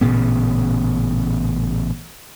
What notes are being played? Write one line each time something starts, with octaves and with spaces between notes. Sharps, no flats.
A1 A#2 C#3 B3